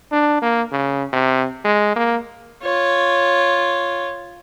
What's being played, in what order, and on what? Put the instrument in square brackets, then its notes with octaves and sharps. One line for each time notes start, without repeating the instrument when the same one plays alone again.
[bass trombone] D4
A#3
C#3
C3
G#3
A#3
[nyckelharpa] F4 C#5